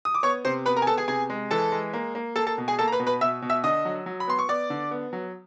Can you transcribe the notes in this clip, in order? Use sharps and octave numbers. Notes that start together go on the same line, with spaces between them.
D#6
D6
B3 C#5 C#6
C3 C5 C6
B3 B4 B5
A#4 A#5
G#5
B3 A4 A5
G#4 G#5
C3 G#4 G#5
G#3
E3 A4 A5
G#3
A#3
A#3
A#3 A4 A5
A4 A5
B2
G#4 G#5
A#3 A4 A5
A#5
B4 B5
B2
B4 B5
B2 E5 E6
B2
E5 E6
D3 D#5 D#6
F#3
F#3
B5
B3 C6
C#6
B3 D5 D6
D3
B3
F#3